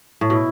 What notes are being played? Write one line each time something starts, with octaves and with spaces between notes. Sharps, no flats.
A2
B2 E4